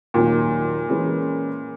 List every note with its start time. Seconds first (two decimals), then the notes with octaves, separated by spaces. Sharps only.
0.14 D#2 A#2 D#3 F#3
0.89 E3 G#3 C#4 G#4 B4